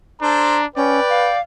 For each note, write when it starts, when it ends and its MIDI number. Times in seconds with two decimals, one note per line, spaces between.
0.22 0.66 62
0.22 0.57 69
0.22 0.57 72
0.22 0.64 82
0.76 1.00 61
0.76 1.30 71
0.76 1.39 74
0.76 1.38 79
1.09 1.41 77